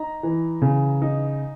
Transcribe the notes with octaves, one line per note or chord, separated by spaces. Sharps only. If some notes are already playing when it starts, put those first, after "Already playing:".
Already playing: D#4 A#5
E3
C#3
D#4